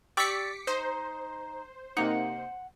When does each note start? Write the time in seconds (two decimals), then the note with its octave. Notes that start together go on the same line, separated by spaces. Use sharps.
0.17 G4 D5 C#6 D6 E6 B6 C#7
0.67 D#4 C5
1.97 C3 A#3 D#4 F#5